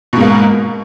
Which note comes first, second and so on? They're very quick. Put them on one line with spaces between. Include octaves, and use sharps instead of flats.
B2 G#2 A#3